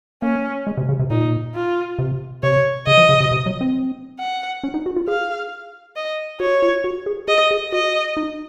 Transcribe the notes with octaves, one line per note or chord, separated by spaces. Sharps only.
A#3 C#4
G#3
C3
C#3
C3
A#2 D#4
F4
C3
C3 C#5
C#3 D#5
F3
C#3
C3
C3
F#3
C4
F#5
C#4
D#4
F#4
F4
G#4 F5
D#5
F#4 C#5
F4
F#4
G#4
G#4 D#5
G#4
F#4 D#5
D#4